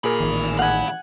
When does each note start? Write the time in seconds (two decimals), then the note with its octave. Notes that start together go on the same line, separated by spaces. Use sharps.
0.04 A#2 G#4 A#4 G#5 B5
0.20 A1 D#3
0.59 F5 F#5 G#5 B5